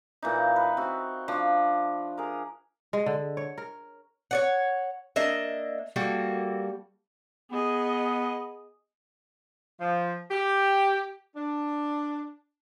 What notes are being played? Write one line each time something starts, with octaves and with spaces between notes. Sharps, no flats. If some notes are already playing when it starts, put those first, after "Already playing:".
A#2 E3 D#4
B4
C4 F#4
F3 D4 C#6
G#4 A#4
G#3
D3
C#5
A#4
C#5 D5 F#5
A#3 D4 D#5 E5
G3 A#3 F#4 A4
B3 G#4 D#5
F3
G4
D4